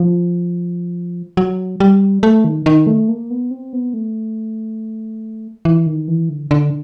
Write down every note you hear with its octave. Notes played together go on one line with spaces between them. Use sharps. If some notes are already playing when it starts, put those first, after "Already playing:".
Already playing: F3
F#3
G3
A3
D#3
D#3
A3
A#3
B3
C4
B3
A3
E3
D#3
E3
D3
D3